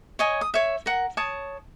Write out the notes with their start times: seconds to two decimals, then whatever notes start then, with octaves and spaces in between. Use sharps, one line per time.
0.19 C#5 D#5 G#5
0.41 D#6
0.54 C#5 E5
0.86 A#4 F#5
1.17 C#5 A5 D#6